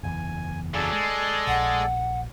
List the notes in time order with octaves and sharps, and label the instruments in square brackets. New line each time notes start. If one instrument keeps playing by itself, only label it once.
[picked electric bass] F#1 E2 E3 [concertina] G#5
[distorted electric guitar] A#2 F#3 [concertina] G#4 A4 D5
[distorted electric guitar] G#3
[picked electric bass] A#1 [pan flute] F#5